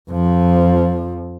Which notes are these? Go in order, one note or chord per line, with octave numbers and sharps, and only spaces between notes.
F2 F3